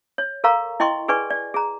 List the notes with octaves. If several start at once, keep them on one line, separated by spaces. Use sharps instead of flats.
C#5
A4 A#4 F5 A#5 C#6
E4 D#5 G5 C6 C#6
G#4 B4 D5 G#5 C#6
D5
G#4 A#5